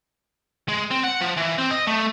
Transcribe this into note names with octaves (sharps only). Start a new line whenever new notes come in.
G#3
C4
F#5
F3
E3
C4
D#5
A3